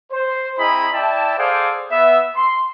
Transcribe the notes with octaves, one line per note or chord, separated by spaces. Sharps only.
C5
C4 E4 G#4 D#5 A#5 B5
E4 D5 E5 G5 A5
G#4 A4 C5 D5 F5 G5
B3 E5
C6